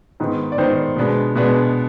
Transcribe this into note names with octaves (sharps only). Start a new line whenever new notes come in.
G#2 D#3 B3 D#4
D5
G#2 D#3 B3 D#4 C5
B2 G#3 B3 D4
B2 G#3 B3 D4